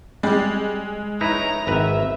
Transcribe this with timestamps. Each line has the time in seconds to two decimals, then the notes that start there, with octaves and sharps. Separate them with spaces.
0.23 G3 G#3
1.21 D#4 E4 B4 C#5 A#5
1.67 G#1 B4 E5